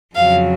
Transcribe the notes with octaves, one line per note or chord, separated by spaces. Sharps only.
F2 C#3 F#3 F5